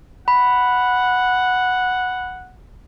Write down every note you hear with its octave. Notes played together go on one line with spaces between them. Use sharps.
F#5 B5